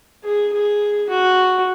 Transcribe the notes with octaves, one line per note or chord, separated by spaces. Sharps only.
G#4
G#4
F#4